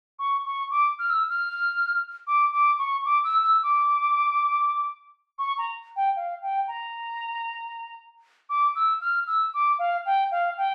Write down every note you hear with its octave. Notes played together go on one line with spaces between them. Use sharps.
C#6
C#6
D6
F6
E6
F6
D6
D6
C#6
D6
E6
E6
D6
C#6
A#5
G5
F5
G5
A#5
D6
E6
F6
E6
D6
F5
G5
F5
G5